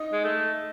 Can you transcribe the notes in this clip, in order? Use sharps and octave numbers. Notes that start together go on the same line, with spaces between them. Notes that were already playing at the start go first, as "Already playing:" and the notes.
Already playing: D#4 D#5
G#3
A3